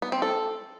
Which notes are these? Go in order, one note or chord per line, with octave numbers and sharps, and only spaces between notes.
B3
C4
A4